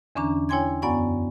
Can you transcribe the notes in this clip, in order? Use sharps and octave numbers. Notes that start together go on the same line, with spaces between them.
E2 D3 E3 C#4 D4 A#5
E4 C#5 G5 G#5 C6 G#6
F#2 B3 D5 F#5 G#5 C#6